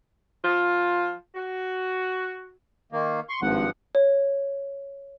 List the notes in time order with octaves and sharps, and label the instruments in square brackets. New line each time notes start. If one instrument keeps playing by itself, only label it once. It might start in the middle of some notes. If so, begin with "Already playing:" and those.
[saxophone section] F3 F4
F#4
[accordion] D#3 A#3
C6 C#6
[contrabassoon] G#1 [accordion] G2 F3 F#5
[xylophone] C#5